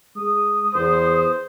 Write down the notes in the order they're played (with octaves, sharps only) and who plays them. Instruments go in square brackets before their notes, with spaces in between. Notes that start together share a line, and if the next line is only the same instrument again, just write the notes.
[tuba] G#3 [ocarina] D#6
[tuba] E2 [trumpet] C5